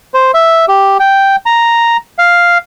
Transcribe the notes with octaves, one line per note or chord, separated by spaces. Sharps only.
C5
E5
G4
G5
A#5
F5